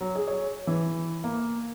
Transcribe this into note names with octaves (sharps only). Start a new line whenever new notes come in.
F#3
G#4
C#5
E3
A#3